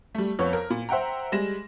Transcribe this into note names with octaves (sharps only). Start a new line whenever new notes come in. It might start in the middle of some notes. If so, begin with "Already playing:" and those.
G3 A3
F2 B3 C#5
A#4
A#2
C5 E5 F#5 G5 A#5
G3 G#3 A#6 E7